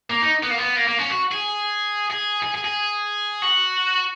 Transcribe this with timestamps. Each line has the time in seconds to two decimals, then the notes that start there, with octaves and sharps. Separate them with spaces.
0.10 A#3
0.22 D#4
0.43 B3
0.50 A#3
0.58 B3
0.76 A#3
0.88 A#3
0.98 C#4
1.10 F#4
1.32 G#4
2.10 G#4
2.42 G#4
2.54 G#4
2.64 G#4
3.42 F#4